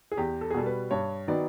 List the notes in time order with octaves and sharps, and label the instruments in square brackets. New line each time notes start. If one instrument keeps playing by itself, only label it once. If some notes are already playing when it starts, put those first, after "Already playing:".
[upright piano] G#4
E2 G4
A4
G#4
B2 G3 A4
B4
G2 C#5
D#3 F#3 B3 D#4 D5